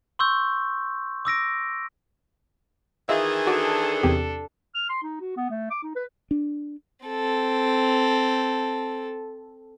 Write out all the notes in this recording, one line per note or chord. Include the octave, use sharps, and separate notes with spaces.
C6 C#6 E6 G6
D6 E6 A#6 D7
D#3 E3 F4 G#4 D#5 E5
D4 F#4 A4 D5
E2 C3 G4
F6
C6
D#4
F#4
B3
A3
D6
D#4
B4
D4
C4 A4